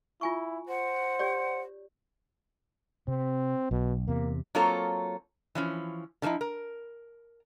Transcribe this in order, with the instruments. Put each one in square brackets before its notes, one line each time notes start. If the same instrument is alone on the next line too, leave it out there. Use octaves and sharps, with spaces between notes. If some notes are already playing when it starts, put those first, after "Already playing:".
[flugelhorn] E4 [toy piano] F4 G#5 C#6
[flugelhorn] C5 [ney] F#5
[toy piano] G4 C#5 D5
[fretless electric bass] C3 [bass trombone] C4
[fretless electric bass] B1 [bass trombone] B2
[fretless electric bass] E2 C3 [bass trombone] A#3
[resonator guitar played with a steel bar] F#3 A#3 C4 F4 A4 C#5
E3 F3 C#4
D3 F3 A3 D#4 E4
A#4